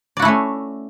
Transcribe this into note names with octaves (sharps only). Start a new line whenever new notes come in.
A3 C#4 E4 F#4 D5